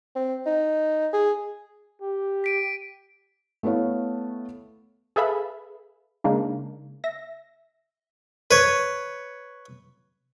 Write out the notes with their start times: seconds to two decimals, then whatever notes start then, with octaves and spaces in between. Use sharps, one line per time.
0.16 C4
0.46 D#4
1.13 G#4
2.02 G4
2.44 B6 D7 D#7
3.63 A3 B3 E4 C#5 F5
5.16 G#4 A4 B4 E5 F5 B5
6.24 C#3 G#3 A#3 D4 D#4
7.04 E5 A#6
8.51 B4 C#5